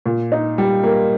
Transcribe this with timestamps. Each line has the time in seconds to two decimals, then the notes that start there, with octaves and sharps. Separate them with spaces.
0.06 A#2
0.32 D#4
0.58 G3
0.84 A#3